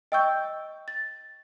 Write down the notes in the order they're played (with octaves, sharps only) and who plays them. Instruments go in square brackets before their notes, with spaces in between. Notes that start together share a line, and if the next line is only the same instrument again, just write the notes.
[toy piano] D#5 C#6 [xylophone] G5 E6 G6
[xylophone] A6